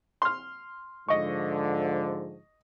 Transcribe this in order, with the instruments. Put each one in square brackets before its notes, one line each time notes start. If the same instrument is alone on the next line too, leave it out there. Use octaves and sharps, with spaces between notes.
[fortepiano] C6 F6
[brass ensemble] G#2 D3 F3 [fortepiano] D#5 C#6